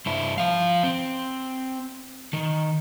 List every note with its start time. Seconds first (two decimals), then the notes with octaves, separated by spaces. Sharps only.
0.06 G2 E4
0.38 F3 F5
0.83 C4
2.33 D#3